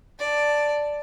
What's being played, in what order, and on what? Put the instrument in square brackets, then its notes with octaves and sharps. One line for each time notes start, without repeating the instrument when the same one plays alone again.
[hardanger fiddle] D5 A5